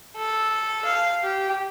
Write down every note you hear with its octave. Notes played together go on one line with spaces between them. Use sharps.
A4
F5
G4